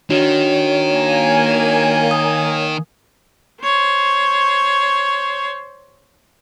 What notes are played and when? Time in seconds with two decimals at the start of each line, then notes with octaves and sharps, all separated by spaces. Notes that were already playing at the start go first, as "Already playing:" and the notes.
0.10 D#3 D4 F#4 C#5
0.91 A#3 G#5
2.11 D#6
3.63 C5 C#5